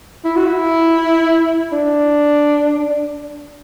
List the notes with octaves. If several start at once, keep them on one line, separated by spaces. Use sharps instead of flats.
E4
F#4
E4
D4